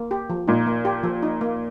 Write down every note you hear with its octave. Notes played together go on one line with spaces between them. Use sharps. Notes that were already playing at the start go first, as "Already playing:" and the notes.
Already playing: A#3
G4
F3
A#2 D#4
A#3
G4
F3
D#4
A#3